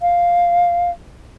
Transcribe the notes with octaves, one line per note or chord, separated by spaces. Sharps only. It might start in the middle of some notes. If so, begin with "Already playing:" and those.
F5